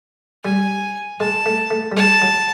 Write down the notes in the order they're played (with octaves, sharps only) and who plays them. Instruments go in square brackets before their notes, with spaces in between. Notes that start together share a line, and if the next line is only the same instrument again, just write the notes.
[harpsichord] G3 [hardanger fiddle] G#5
[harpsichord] G#3 [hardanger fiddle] A5
[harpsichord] A3
A3
G3
[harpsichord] G#3 [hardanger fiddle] A5
[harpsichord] F#3